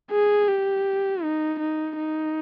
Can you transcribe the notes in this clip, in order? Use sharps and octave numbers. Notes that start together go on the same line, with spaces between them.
G#4
G4
D#4
D#4
D#4